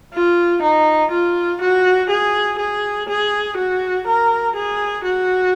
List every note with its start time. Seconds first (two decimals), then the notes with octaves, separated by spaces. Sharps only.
0.14 F4
0.62 D#4
1.12 F4
1.61 F#4
2.10 G#4
2.58 G#4
3.09 G#4
3.57 F#4
4.07 A#4
4.55 G#4
5.05 F#4